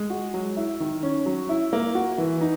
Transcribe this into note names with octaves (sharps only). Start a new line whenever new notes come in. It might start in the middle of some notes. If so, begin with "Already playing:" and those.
Already playing: G#3
F#4
F#3
E4
D#3
C#4
F#3
E4
A#3
F#4
E3
D#4